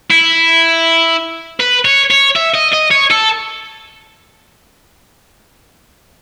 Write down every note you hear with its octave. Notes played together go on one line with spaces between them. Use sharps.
E4
B4
C#5
C#5
E5
D#5
D#5
C#5
A4